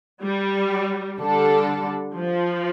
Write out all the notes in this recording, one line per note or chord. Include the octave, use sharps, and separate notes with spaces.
G3
D3 G3 D4 A4
F3